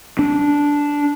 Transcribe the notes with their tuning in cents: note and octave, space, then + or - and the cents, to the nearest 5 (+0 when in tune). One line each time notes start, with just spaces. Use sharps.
D4 -10